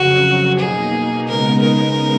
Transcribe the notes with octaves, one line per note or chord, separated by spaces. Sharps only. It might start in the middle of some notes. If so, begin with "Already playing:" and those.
Already playing: F2 C#3 F#3 F#4
B2 A#3 D#4 G#4
C#3 G#3 B3 D#4 A#4
A#4